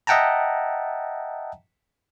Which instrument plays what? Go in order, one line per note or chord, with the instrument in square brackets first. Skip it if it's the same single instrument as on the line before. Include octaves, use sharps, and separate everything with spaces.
[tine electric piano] D#5 E5 F#5 G5 A5 A#5